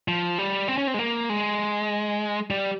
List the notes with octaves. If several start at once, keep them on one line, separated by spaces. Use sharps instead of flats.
F3
G3
C4
C#4
C4
G#3
A#3
G#3
G3